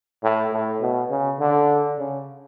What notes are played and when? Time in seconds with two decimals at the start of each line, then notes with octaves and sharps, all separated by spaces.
0.23 A2
0.52 A2
0.82 B2
1.10 C#3
1.40 D3
1.98 C#3